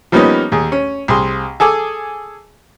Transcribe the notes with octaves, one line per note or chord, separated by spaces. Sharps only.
F3 G3 A#3 B3 C#4 D#4
D#2 G#4
C#4
C2 G#4 C6
G#4 A4 G#5 D6